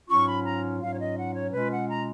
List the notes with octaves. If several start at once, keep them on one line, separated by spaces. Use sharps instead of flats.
G#2 F#3 C#4 F4 C#6
B5
A#5
G#2 F#3 C#4 F4 F5
C#5
D#5
F#5
C#5
B2 G#3 C#4 F4 B4
F#5
A#5